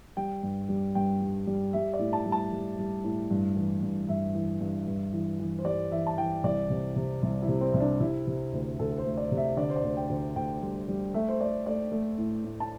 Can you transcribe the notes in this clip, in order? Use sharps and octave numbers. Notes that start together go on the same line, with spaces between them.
G3 G5
G2
G3
G2 G5
G3
G3
G3 E5
D5
A2
A5
G3
A5
G3
G3
A2
G2
E3
G2
G2 E5
E3
G2
G2
E3
E3
C5
G3 D5
E3 E5
A5
E3 G5
C2 D5
C3
C3
C2
E4
C3
C4
C2
D4
C3 E4
C3
D2
D2 A4
A4
C5
A3
D5
C3
E5
D3 D5
C5
D5
D2
G5
D2
D2 G5
G3
G3
A3 E5
C5
A3 D5
A3 D5
A3
A2
A2
A5